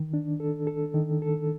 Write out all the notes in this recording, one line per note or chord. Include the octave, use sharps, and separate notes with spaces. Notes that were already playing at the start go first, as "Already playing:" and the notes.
Already playing: D#3
D4
A4
A4
D#3
A4